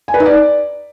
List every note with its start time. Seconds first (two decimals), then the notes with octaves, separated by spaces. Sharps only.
0.08 G#5
0.14 B4
0.20 D#4
0.26 D5